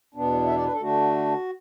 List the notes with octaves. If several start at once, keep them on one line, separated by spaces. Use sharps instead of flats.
E2 B2 B3 D4
E5
D5
B4
A4
D3 A3 D4 F#4